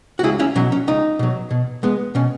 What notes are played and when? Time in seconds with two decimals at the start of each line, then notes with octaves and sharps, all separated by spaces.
0.19 F#4
0.23 C#2 E4 G#4
0.40 C#4 E4
0.56 B2 F#3 C#4
0.72 C#4
0.88 C#2 D#4
1.19 B2 F#3
1.51 B2
1.83 G#3 B3
2.15 B2 C#4